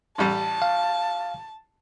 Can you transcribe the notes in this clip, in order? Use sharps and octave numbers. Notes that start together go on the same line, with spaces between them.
A1 G3 A5
F5